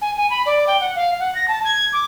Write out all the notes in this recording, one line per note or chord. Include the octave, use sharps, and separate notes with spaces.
G#5
G#5
B5
D5
G5
F#5
F5
F#5
A#6
A5
G#6
D6